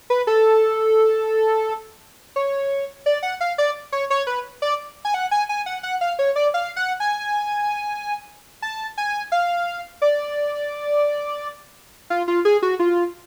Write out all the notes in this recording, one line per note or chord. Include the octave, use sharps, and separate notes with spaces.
B4
A4
C#5
D5
F#5
F5
D5
C#5
C#5
B4
D5
G#5
F#5
G#5
G#5
F#5
F#5
F5
C#5
D5
F5
F#5
G#5
A5
G#5
F5
D5
F4
F4
G#4
F#4
F4